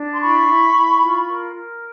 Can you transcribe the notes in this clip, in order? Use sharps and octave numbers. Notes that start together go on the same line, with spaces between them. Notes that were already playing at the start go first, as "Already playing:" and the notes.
Already playing: D4
C6
E4 B5 C#6
E4
E4
F4
A#4
A#4